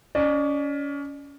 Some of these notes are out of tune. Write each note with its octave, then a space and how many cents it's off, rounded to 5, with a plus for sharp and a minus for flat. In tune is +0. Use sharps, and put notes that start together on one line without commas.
C#4 +30 D5 +35